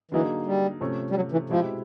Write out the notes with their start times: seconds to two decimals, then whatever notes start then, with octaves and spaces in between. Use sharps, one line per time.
0.11 D3 E3 F#3 A#3 D#4 G#4
0.46 G3
0.81 C3 F3 A3 C#4
1.10 G3
1.15 F#3
1.32 E3
1.49 B2 F3 G#3 C4 E4 G4